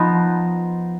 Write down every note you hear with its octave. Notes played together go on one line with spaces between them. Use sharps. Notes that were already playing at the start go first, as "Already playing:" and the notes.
Already playing: F3 B3 D#4